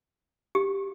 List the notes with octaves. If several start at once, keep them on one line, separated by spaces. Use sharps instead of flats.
G4